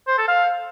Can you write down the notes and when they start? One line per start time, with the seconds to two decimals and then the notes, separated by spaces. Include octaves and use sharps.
0.08 C5
0.18 A4
0.28 F5